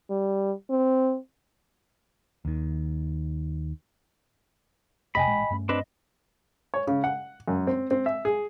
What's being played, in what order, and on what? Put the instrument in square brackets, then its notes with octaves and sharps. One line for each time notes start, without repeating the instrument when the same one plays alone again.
[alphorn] G3
C4
[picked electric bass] D#2 D#3
[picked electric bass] A1 F2 C3 [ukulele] D#5 G5 G#5 [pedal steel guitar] B5
[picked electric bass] A1 A#2 G#3
G2 A3 C#4
[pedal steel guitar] C4 D4 B4 [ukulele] D#5
[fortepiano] C#5
C#3
F#5
F#2
C4
C4
E5
G#4